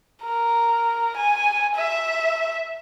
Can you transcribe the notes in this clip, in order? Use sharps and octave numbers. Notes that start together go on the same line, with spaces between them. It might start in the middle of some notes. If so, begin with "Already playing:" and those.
A#4
G#5
E5